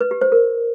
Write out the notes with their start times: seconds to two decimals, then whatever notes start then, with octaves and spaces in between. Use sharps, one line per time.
0.01 B4
0.11 G4
0.21 C5
0.32 A#4